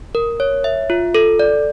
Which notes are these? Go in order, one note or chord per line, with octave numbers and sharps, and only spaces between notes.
A#4
C#5
E5
F4
A4
D5